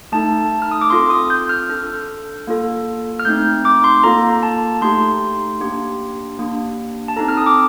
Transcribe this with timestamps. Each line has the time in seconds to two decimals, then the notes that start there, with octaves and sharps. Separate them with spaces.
0.12 A3 D#4 A4 A5
0.62 F6
0.71 D#6
0.81 D6
0.90 C4 F4 A4 C6
1.10 D#6
1.30 G6
1.49 F6
1.69 D4 A4
2.47 A#3 F4 A4
3.19 F6
3.25 A3 C4 D#4 G6
3.65 D6
3.84 C6
4.03 A#3 F4 A4 A#5
4.43 A5
4.81 A3 D#4 G4 C6
5.60 A#3 D4 G4
6.39 A#3 D4 G4
7.08 A5
7.16 C4 D#4 A4 A#5
7.29 F6
7.37 D#6
7.46 D6